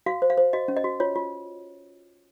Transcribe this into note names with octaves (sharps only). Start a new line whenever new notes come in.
F#4 F5
C5
F5
C5
F#4 D#5
C#4
D#5
F#4
F4 C#5
F4